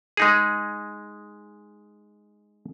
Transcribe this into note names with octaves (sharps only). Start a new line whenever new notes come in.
G#3 D#4 G#4